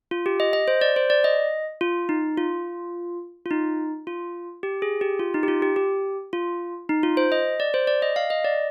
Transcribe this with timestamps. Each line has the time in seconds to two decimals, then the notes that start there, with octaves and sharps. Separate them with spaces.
0.11 F4
0.26 G4
0.40 D#5
0.53 D#5
0.68 C5
0.81 D5
0.96 C5
1.10 D5
1.24 D#5
1.81 F4
2.09 D#4
2.38 F4
3.46 F4
3.51 D#4
4.07 F4
4.63 G4
4.82 G#4
5.01 G4
5.20 F4
5.34 D#4
5.43 G4
5.48 F4
5.62 G4
5.76 G4
6.33 F4
6.89 D#4
7.03 F4
7.17 C5
7.32 D#5
7.60 D5
7.74 C5
7.87 D5
8.02 D#5
8.16 F5
8.30 D#5
8.45 D5